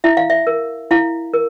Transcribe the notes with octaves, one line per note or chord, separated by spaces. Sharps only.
E4 E5
F5
E5
A#4
E4 F5
A#4